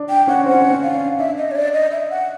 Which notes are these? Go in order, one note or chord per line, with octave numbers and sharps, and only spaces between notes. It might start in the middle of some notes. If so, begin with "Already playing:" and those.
Already playing: D4
G5
C#4 F#5
C4 F#5
C#4
C4
C#4
F5
D4
D4 E5
D#5
C#5
D5
D#5
E5
F#5